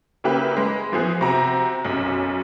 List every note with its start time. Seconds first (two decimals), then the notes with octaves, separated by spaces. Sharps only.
0.24 C#3 A#3 E4 G4 B4
0.57 G#3
0.92 E3 F3 B3 G#4
1.21 C3 F#4 A#5
1.85 B1 F#2